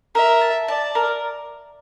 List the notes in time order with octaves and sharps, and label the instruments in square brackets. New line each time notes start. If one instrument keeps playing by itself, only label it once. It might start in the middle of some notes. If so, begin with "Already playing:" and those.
[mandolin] A#4 [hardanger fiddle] E5
[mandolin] A5
[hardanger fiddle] D5 [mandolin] A5
[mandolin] A#4